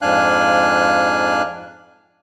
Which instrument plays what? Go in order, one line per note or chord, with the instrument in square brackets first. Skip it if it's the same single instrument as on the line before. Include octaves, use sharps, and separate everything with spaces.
[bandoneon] F2 G#2 D4 F5 G#5 F#6